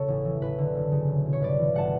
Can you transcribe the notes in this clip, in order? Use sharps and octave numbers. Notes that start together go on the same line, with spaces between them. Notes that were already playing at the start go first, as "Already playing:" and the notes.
Already playing: E1 C#3 A4 C#5
A1
E3
A1 B4
D3
F#1
C#3
E1
B2
C#5
G1 B4 D5
E3
G1 F#5 A5